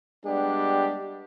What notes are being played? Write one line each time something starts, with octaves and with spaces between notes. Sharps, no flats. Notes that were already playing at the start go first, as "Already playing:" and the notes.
G3 G#3 B3 D4 G4